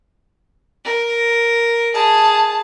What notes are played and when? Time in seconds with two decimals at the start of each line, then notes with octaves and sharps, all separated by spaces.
0.85 A#4
1.94 G#4 A5